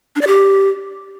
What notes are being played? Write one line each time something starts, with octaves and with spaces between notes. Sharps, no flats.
D4
D5
G4